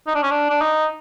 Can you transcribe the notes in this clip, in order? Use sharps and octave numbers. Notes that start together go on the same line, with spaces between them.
D#4
D4
C#4
D4
D4
D#4